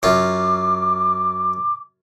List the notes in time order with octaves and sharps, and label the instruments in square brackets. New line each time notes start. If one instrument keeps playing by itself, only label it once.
[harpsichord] F#2 F4 [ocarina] D6